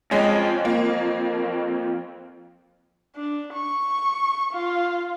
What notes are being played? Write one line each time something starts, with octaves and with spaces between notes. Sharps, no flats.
F2 G#3 C#4
A#3
D4
C#6
F4